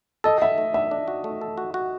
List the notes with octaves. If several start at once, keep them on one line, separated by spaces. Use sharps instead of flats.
A4 D#5
A4 E5
A3
D4 E5
D4
F#4
A3
A4
F#4
F#4